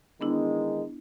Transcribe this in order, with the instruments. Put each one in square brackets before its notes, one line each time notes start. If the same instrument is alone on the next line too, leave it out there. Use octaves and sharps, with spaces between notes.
[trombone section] D#3 E3 G#3 [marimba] B3 D4 E4